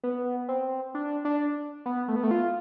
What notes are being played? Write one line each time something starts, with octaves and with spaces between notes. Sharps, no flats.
B3
C4
D4
D4
B3
A3
B3
A3
F4